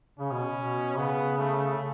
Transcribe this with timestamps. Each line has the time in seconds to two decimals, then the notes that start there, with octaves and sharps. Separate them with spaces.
0.19 C#3 C#4
0.32 B2
0.57 B2
0.98 C#3 B3
1.38 A3
1.77 C#3